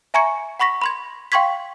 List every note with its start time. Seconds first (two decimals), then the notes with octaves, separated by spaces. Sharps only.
0.14 E5 G#5 A#5 C#6 G#6 C#7
0.60 F#5 B5 C#6 A#6 B6
0.82 B5 C6 G#6
1.32 F5 G5 C6 C#6 G#6 B6